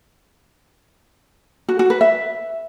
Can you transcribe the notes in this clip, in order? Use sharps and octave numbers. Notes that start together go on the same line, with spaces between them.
F#4
F#4
B4
E5